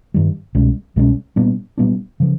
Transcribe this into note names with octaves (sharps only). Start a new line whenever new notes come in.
G2 D#3 G3
C2 B2 G#3 C#4
C2 B2 G#3 C#4
A#2 G3 B3 D4
A#2 G3 B3 D4
C#3 F3